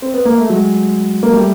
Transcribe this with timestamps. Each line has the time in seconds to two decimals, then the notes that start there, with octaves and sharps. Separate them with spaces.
0.02 C4
0.14 B3
0.25 A#3
0.38 A3
0.50 F#3 G#3
1.23 A#3
1.33 G3 A3